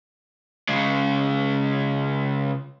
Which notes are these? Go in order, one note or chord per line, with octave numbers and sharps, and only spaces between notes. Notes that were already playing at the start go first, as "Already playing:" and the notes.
C#3 G#3